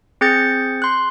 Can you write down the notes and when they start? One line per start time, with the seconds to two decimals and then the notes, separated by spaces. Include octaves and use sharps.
0.21 C4 G#4 G6 A6 C#7
0.82 C6 F#6